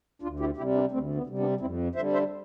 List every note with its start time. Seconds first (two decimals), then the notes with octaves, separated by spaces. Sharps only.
0.22 D2 D4 F4
0.39 E4 G4
0.57 C3 E4 G4
0.61 G3
0.74 B3 D4
0.91 D2 A3 C4
1.15 B3
1.27 C3 G3
1.38 B3 D4
1.61 F2 C4 E4
1.95 D3 C5 E5
1.99 G3
2.13 C5 E5